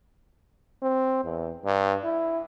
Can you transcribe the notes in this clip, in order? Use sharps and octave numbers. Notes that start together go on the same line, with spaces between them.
C4
E2
G2
E4